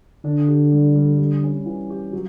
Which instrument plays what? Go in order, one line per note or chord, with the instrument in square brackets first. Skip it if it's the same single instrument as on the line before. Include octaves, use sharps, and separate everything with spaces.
[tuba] D3 [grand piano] D4
[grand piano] G4
G3
G3
G3
C#4
E3
G4
F#3